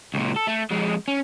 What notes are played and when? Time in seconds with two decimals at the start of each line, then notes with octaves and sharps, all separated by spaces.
0.14 C#2 A#2
0.37 A4
0.48 A3
0.71 F2 G#3
1.08 C#4